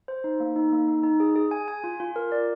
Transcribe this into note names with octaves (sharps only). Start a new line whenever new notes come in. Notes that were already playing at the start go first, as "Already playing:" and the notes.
C5
D#4
A#3
D#4
A#3
D#4
D#4
G#4
G#4
G#5
G#5
F4
F4
A#4
D5